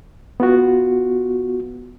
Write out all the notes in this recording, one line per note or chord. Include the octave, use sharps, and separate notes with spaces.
B3 F4 F#4